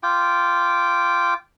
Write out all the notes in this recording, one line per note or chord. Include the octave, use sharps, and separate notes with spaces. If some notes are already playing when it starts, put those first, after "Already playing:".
F4 G5 D6